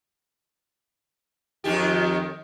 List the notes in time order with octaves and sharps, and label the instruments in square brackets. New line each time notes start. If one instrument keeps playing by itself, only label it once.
[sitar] F2 D#3 G4